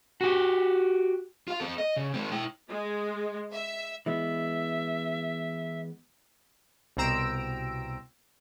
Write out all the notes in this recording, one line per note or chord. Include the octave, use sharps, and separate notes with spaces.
F#4 G4
F4 F5
C4 A4
D#5
C#3
G#3 C4
E4 G5
G#3
E5
E3 G#3 B3 E5
C2 B2 C4 A#5 E6 D7